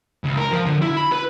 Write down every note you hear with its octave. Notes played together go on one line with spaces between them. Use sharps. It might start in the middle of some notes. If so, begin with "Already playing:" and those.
C#2
A#4
F3
D3
E4
B5
B4